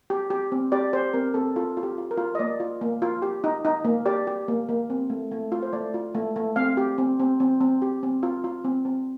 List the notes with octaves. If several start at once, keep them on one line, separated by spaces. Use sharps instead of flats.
G4
G4
C4
G4 D5
G4 C5
C4 A#4
C4 A4
F4 A4
F4
G4
F4
A#4
F4
D#5
A#3 D5
F4
A#3
F4
G4
D#4
D#4
A#3
G4 D5
G4
A#3
A#3
C4
A3
A3
F4
C5
A3 D5
F4
A3
A3
C4 F5
G4
C4
C4
C4
C4
G4
C4
F4
F4
C4
C4